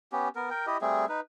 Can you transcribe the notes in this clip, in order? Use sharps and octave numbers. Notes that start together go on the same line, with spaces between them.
B3 C#4 G4
B3 A#4
A#4 G5
E4 G4 D#5
G3 A3 C4 G#4
D#4 B4